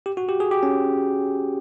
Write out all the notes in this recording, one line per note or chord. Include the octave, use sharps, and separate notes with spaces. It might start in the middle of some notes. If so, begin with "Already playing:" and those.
G4
F#4
G4
G#4
G4
C#4